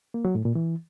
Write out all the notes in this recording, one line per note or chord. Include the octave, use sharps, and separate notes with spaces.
A#3
F#3
A2
A#2
E3